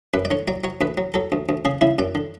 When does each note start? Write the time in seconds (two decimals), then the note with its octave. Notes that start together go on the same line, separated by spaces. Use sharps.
0.14 F#2 B4
0.25 D5
0.31 D3 C#5
0.48 F#3 D5
0.64 F#3 C#5
0.81 D2 B4
0.98 F#3
1.14 F#3 A4
1.32 D2
1.49 D2
1.65 C#3 G#4
1.81 C#3 E4
1.99 F#2 D5
2.15 D3